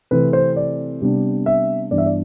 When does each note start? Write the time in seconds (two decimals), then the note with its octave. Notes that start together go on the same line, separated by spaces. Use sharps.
0.11 C3 E3 A3 C4 B4
0.33 C5
0.56 D5
1.02 C3 G3 B3 D4
1.46 E5
1.91 G2 E3 B3 D4 D5
1.98 E5
2.06 D5